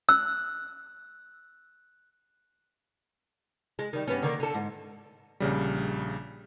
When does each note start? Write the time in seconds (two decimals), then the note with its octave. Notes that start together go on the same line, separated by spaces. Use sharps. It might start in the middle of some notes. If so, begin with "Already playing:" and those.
0.09 E6 F#6
3.79 G#3
3.93 D#3 G3
4.08 G2 B3 C#4
4.23 D3 D#3 A#3
4.40 D3 A4
4.54 G#2
5.40 A#1 C#3 G3